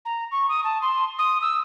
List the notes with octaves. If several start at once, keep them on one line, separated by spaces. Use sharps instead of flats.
A#5
C#6
D#6
A5
C6
D#6
E6